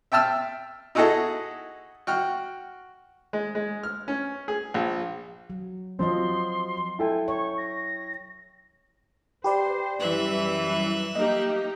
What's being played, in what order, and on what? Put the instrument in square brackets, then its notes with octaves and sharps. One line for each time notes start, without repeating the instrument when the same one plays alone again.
[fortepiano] E5 G5 A5 E6 F6
D#4 E4 F#4 G#4 A4 D#5
F#4 G5 F6
G#3
G#3
F6
C#4
G#4
A#1
[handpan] F#3
[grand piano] F3 C4 [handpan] F#3 F#4 D#5 [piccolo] C6
[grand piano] E4 A4 G5 [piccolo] G#5
[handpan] C#5 [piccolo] C#6
[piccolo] A#6
[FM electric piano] G4 B4 D5 [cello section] C5
[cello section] F#2 E3 G3 [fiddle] E5 F#6
[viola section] A#3 D#4 G4 [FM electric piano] D#5